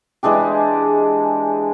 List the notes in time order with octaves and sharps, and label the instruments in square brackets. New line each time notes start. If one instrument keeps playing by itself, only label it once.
[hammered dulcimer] E3 G#3 D4 G4